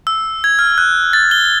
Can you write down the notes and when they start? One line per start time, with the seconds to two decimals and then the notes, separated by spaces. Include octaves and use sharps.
0.07 E6
0.44 G#6
0.59 F6
0.78 F#6
1.13 A6
1.31 G7